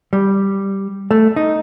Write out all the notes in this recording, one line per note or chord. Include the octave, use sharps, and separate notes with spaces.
G3
A3
D#4